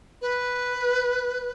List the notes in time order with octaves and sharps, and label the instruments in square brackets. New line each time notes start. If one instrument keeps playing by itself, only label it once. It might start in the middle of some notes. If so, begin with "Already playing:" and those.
[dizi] B4